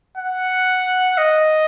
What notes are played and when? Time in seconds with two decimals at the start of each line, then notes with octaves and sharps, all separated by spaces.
0.17 F#5
1.18 D#5